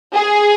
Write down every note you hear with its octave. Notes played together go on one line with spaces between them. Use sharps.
G#4